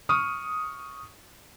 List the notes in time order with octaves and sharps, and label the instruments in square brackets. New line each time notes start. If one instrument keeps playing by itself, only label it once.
[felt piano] C#6 D#6 F6 D#7